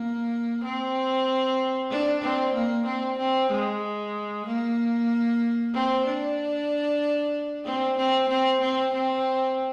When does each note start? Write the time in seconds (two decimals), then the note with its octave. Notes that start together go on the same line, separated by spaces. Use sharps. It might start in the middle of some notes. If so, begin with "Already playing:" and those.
Already playing: A#3
0.64 C4
1.90 D4
2.22 C4
2.54 A#3
2.86 C4
3.18 C4
3.50 G#3
4.46 A#3
5.73 C4
6.05 D4
7.65 C4
7.97 C4
8.28 C4
8.61 C4
8.93 C4